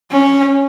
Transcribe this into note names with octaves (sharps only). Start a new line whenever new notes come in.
C#4